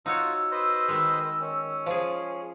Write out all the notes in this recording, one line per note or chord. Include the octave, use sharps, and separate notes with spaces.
D#4 F4 F#4 C#5 E6
B4 C5 D#5
D#3 G#3
C#4
F3 G#4